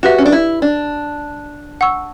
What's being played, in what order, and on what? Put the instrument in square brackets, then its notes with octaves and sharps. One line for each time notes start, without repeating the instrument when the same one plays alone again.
[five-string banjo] F#4 [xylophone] G4 B4 E5
[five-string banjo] C#4
D4
E4
D4
[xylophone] F#5 C#6 E6